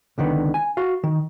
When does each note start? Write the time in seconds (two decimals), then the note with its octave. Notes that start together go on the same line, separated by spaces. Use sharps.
0.18 C#2 D3 D#3 B3
0.54 G#5
0.77 F#4 F5
1.04 D#3